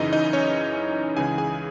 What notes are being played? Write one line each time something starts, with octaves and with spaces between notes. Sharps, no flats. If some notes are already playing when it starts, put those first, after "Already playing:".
Already playing: F#2 C#3 E3 D#4 D#5
D#4 D#5
C#4 C#5
C#2 C#3 E3 G#4 G#5
G#4 G#5